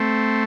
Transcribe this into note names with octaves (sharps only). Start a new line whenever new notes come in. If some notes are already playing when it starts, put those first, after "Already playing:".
Already playing: A3 C4